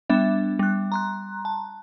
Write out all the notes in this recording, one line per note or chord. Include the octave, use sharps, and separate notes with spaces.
G3 B3 D4 E5
G3 F#6
A#5 C6 F#6
A5